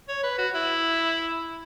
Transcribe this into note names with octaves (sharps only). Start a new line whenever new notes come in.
C#5
B4
F#4
E4